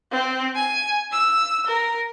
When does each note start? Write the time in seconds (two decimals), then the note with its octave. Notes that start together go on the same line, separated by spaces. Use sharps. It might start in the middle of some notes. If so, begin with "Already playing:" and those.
0.11 C4
0.55 G#5
1.12 E6
1.67 A#4